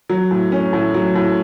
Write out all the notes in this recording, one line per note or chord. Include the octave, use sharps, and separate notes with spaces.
F#3
A2
C#4
A2
F#3
A2